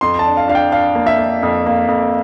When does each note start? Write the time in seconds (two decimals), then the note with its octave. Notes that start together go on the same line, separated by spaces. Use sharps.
0.01 F2 C6
0.19 A5
0.26 D4
0.37 F5
0.48 D4 F5
0.55 G5
0.72 D4 F5
0.95 A#3
1.06 E5
1.18 A#3
1.43 F2
1.66 A#3
1.88 F2